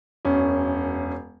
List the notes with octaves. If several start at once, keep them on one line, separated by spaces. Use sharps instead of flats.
E1 F#2 C#4